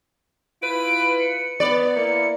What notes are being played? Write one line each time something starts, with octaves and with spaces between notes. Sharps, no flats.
E4 F4 B4 D7
C#7
B3 D5
A#3 E4 C#7